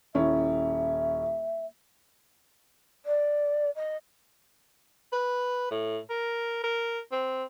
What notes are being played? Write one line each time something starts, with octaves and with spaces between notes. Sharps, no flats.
D#1 C#4 E4 E5
D5
D#5
B4
A2
A#4
A#4
C4